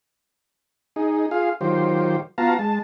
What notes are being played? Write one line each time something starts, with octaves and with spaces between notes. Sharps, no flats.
D#4 G#4
F4 G#4 F5
D#3 F#3 F4 G4 C5
B3 F4 F#4 F5 A5 A#5
G#3 A5